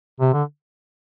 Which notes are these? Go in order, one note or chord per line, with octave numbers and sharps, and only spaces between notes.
C3
D3